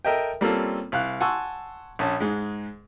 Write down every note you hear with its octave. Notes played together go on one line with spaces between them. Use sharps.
A4 A#4 D#5 E5 G5
G3 A#3 C4 C#4 F4 A4
C2 F5 F#6
F#5 G#5 A5 C6 C#6 E6
A#1 C#4 A5
G#2 G#3